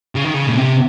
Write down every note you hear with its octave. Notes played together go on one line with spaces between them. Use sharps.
C#3
D#3
C#3
A#2
C3